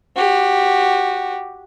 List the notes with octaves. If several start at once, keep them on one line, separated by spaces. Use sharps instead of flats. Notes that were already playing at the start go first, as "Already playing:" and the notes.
F#4 G4